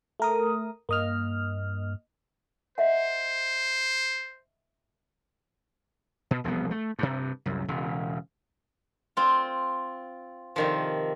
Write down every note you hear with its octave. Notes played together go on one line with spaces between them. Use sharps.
A3 A#4 D#6
G2 A#3 D#5 F6
C5 D#5 E5 F#5
B2
E1 C2 F3 B3
A3
G2 C3
C2 F#2
E1 C#3
C4 F4
C3 D#3 F3